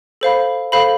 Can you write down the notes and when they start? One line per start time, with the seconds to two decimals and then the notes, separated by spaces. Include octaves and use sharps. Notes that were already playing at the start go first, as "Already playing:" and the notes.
0.21 A4 C5 F5 B5
0.72 A4 C5 F5 B5